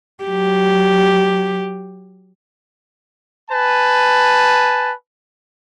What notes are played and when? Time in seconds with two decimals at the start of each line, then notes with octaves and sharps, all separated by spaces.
0.24 F#3 G4
3.50 B4 G#5 A5